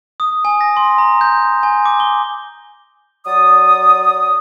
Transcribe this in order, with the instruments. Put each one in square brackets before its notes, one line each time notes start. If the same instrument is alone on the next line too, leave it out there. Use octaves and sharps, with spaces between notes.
[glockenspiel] D#6
G#5
A#6
C6
A#5
G6
G#5
D6
G7
[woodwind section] F#3 D5 D#6